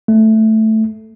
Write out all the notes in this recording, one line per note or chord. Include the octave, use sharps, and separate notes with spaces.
A3